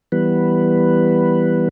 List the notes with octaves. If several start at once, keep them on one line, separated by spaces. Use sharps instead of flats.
E3 G3 B3 B4